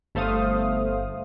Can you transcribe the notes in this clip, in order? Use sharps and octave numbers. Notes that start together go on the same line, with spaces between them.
G1 A3 C5 F5 D#6